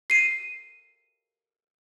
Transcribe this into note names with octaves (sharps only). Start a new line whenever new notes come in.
C7 D#7